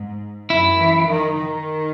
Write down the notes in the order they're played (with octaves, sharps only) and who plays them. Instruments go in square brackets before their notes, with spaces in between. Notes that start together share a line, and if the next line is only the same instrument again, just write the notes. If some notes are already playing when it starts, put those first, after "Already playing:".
Already playing: [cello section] G#2
[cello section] F#2 [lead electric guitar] E4
[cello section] E3
D#3
D#3